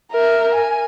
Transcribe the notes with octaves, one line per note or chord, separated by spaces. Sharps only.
A#4 E5
G#5